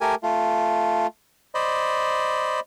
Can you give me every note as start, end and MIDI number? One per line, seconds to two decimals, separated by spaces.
0.01 0.15 57
0.01 0.15 67
0.01 0.15 70
0.01 0.15 80
0.23 1.07 57
0.23 1.07 65
1.55 2.60 72
1.55 2.60 74
1.55 2.60 75
1.55 2.60 83